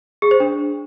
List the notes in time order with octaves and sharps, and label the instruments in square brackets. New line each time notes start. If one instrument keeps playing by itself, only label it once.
[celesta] G#4
C5
D4